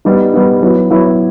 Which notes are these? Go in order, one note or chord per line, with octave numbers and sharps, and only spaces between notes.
G3 B3 D#4
G3 B3 D#4
F#3 B3 E4
F#3 B3 E4